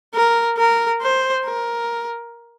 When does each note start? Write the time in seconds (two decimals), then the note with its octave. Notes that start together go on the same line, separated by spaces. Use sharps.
0.14 A#4
0.58 A#4
1.02 C5
1.45 A#4